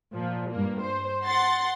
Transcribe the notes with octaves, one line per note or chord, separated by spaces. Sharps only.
A#2 F3
G2 A#3
C5
F#5 C6 A6